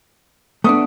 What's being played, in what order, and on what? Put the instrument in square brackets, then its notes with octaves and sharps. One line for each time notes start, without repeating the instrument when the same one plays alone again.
[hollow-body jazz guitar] A3 B3 D4 [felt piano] D#6